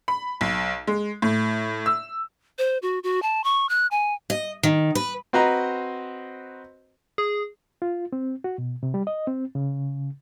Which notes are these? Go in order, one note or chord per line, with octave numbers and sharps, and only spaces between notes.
B5
B1
G#3
A2
E6
C5
F#4
F#4
A5
C#6
F#6
G#5
D#5
D#3
B4
C4 F#4 B4 C5 D#5 A#5
G#4
F4
C4
F#4
B2
C3
G3
D#5
C4
C#3